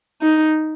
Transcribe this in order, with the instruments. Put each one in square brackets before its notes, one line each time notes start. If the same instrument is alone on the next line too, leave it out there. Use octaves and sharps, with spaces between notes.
[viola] D#4